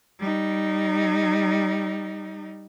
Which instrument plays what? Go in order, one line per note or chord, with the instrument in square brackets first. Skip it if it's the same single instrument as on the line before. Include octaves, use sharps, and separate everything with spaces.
[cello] G3 D#4